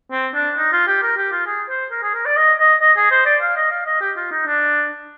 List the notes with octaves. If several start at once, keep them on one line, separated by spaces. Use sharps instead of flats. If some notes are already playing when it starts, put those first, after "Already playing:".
C4
D4
D#4
F4
G4
A#4
G4
F4
G#4
C5
A#4
G#4
A#4
D5
D#5
D#5
D#5
G#4
C5
D5
F5
D#5
F5
D#5
G4
F4
D#4
D4